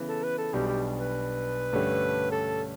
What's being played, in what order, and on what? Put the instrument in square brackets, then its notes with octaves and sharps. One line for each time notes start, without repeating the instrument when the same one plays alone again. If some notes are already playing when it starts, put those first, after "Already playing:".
Already playing: [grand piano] C#3 E3 B3
[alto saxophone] A4
B4
A4
[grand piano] B1 B2 G3 D4 [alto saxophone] G4
[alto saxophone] G4
B4
[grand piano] G2 D3 A3 C#4 G4
[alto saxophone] A4